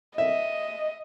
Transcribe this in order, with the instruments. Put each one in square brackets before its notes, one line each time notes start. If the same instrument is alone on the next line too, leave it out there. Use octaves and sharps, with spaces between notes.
[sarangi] D#5 [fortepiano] E5